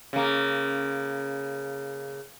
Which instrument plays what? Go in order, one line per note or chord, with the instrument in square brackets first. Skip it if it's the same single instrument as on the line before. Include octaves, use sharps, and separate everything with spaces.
[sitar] C#3 A#3